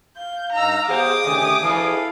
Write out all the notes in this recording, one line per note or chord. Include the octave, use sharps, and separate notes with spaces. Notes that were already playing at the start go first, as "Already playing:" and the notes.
F5 G6
G2 D#4 A#5 E6
G#3 B3 G4 G#4 C5 F#5 D6 D#6
D#2 C3 A3 G4 G#5
E2 B2 G#3 E4 A4 F5